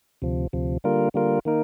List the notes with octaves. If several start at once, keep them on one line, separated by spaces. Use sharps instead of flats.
D2 C3 F3
D2 C3 F3
D3 G3 A#3 F4 A#4
D3 G3 A#3 F4 A#4
D#3 A#3 D#4 A#4